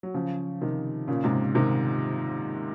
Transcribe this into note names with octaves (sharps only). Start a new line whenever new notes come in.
F#3
C#3 F3
C3 D#3
A#2 C#3
G#2 C3
C3 D#3